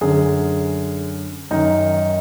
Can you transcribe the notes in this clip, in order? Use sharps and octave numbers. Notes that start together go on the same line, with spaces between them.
F#2 D3 G#4
F#2 D#3 D#4